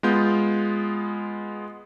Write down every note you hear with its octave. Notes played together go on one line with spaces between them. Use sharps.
G#3 B3 F4 G6